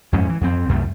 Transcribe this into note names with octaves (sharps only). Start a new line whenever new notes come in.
F2 G#2 C#4
E3
F2 C4
C2 F#2 A3